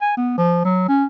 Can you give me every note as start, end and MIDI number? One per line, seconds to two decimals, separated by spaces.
0.02 0.12 80
0.17 0.34 59
0.38 0.60 53
0.65 0.87 54
0.88 1.05 61